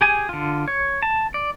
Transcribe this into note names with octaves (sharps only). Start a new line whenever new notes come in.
G4 G#4 G#5
D3 F4
C#5
A5
D5